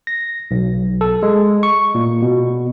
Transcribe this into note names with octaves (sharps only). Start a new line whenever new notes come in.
A#6
B1
A4
G#3
C#6
A#2
B2